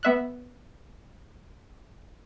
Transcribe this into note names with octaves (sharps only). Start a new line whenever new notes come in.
B3 E5 F#6